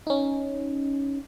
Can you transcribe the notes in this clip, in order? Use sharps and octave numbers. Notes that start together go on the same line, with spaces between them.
C#4 D#4